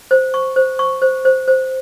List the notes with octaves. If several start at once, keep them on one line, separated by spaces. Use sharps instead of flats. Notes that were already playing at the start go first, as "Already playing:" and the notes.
C5
C#6
C5
C#6
C5
C5
C5